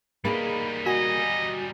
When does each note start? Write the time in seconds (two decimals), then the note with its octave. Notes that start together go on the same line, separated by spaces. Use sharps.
0.25 G3 A#3 D#4 G#4 B5
0.86 F#4 D#5 G#5